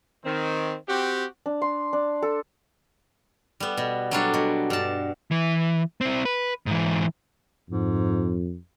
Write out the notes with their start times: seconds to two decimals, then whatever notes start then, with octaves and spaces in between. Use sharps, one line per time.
0.24 D#3 C4
0.87 C4 F#4 G4
1.46 D4
1.62 C6
1.93 D4
2.22 A4
3.60 G3 B3
3.77 B2
4.11 F#3 G3 D4 A4
4.34 B2
4.70 G2 A5
5.31 E3
6.01 C4 E4
6.25 B4
6.66 G#2 E3
7.70 F2 G#2